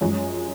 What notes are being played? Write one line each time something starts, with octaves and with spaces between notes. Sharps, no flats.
F#2 F3 G#3 C#4